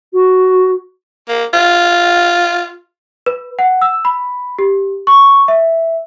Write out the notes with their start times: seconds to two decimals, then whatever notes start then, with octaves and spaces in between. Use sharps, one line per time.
0.13 F#4
1.28 A#3
1.53 F4
3.26 B4
3.59 F#5
3.82 E6
4.05 B5
4.59 G4
5.07 C#6
5.48 E5